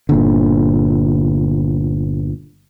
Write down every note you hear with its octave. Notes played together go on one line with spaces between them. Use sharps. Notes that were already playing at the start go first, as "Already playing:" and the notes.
G1 A#2 D3